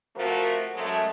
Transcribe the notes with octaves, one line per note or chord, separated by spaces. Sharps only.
C3 F3 A3 F#4 A#4 C5
F#2 F#3 G#3 A3